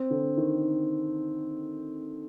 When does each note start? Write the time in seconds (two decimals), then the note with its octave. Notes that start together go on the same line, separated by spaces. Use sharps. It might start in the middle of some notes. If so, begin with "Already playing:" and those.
Already playing: C4
0.10 D3
0.37 D#3